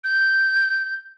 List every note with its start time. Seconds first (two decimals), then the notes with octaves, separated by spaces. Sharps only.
0.04 G6